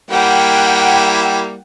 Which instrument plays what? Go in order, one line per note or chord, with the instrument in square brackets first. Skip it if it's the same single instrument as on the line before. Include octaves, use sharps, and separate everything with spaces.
[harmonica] G3 A#3 E4 [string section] F#5 G5